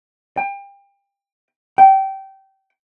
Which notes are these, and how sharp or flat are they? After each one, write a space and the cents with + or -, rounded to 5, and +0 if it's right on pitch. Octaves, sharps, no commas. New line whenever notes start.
G5 +30
G5 -20